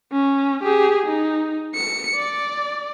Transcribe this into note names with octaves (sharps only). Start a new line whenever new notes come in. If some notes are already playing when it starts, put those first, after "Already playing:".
C#4
G4 G#4
D#4
C#7
D5